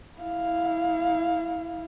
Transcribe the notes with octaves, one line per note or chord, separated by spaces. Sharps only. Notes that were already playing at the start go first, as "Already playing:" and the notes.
E4 F5